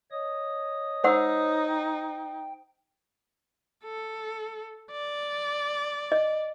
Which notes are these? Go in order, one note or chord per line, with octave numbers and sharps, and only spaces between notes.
C#5 D#5 D#6
D#4 C5 F#5 E6
G5
A4
D5
D#5